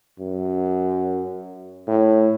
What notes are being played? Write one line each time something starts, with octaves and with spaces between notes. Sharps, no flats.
F#2
A2